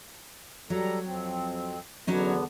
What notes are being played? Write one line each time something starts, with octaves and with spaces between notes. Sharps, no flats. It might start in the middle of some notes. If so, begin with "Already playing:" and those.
F#3 G3 A4 A#5
F2 C4
E2 D3 F#3 B3 C#4 D#4